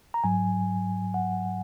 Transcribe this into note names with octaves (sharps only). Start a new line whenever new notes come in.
A#5
G#2 F#3 G#5
F#5